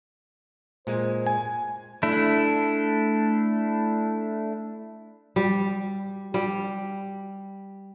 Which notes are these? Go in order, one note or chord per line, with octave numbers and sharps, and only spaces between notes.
A#2 G#3 C5
G#5
A3 D4 E4
G3
G3